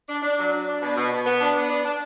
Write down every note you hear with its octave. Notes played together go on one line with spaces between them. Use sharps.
D4
D4
F#3
D4
D4
B2
B2
B2
B3
D4
B3
D4
D4